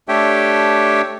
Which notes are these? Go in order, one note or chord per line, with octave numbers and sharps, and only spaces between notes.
A3 D4 G4 C#5 E5 G5